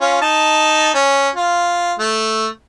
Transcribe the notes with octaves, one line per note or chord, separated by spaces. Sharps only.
C#4 F4
D#4 A5
C#4
F4
A3